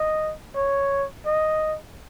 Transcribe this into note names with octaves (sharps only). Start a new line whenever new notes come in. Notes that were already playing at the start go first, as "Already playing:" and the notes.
Already playing: D#5
C#5
D#5